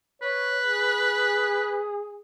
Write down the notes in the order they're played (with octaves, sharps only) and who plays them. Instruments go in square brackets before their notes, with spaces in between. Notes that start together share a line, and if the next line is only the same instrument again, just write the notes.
[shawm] B4 [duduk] C#5
[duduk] G#4